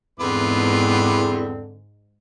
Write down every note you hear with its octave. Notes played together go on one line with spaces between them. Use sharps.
E2 G#2 D3 C4 F4 B4 D6